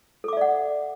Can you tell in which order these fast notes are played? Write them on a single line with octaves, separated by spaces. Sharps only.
A4 D6 E5 D5 F#5